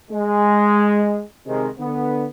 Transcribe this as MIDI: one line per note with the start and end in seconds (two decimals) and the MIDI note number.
0.11 1.20 56
1.46 1.67 48
1.46 1.67 51
1.46 1.67 56
1.79 2.26 50
1.79 2.26 59